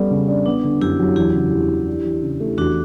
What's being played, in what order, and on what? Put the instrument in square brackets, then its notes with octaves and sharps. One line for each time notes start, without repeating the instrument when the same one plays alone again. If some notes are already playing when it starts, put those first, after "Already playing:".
Already playing: [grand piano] G3 B3 A4 [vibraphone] C#4
[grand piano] C#3
D4
[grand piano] B3 [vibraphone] D4
[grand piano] D3
[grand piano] F#2 [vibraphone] E4 G4
[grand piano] F#3
[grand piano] E2 [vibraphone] E4 G4
[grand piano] C#3
E2
E3
D4
E3
C#3
A3
[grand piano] E2 [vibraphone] D4 F#4